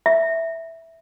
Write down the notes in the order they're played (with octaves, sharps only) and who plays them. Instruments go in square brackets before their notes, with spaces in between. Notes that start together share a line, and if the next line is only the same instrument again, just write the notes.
[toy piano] E5